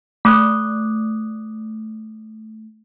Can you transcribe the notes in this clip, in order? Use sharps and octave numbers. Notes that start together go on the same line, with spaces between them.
A3 D6 D#6 F#6